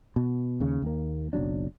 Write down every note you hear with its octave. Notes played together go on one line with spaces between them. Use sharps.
B2
D#2 C#3
D#2 A#3
F#1 B1 F#3 D4